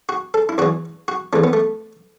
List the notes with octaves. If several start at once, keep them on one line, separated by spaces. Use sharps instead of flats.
F#4
A4
E4
E2 E3 F#4
F#4
E2 E3 A3
B3
A3